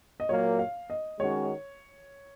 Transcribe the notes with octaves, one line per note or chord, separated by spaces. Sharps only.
D#5
A#2 F#3 A#3 C#5
F5
D#5
D#3 G#3 C#4 F#4 C#5